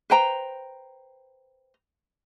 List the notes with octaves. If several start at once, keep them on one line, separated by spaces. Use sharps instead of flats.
B4 C5 G5 A#5